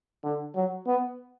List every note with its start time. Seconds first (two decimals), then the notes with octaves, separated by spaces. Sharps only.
0.24 D3
0.55 F#3
0.87 B3